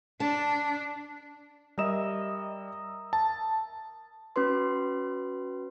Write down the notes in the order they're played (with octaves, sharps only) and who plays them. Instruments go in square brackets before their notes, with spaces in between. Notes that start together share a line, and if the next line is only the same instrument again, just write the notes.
[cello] D4 [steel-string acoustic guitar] A5
[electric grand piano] G3 E7 [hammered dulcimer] A#4 D#5 E5
[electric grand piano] A5
[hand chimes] C#4 F#4 B4 C6